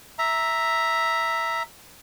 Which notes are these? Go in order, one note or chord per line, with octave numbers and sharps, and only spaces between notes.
E5 A#5